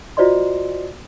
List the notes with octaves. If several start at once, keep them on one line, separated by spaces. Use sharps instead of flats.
F4 F#4 C5 D5 D#5 C6